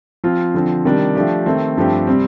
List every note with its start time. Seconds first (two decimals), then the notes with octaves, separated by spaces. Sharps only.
0.24 F3 C4 F4
0.54 D3 F3 C4
0.85 C3 D#3 G3 D4
1.15 F3 A3 D4 G4
1.46 D#3 A3 C4
1.77 G2 F3 A3 C4 G4
2.07 C3 G3 C4